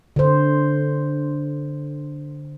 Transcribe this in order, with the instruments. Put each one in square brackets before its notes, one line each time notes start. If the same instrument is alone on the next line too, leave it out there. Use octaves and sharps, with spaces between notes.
[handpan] D3 C5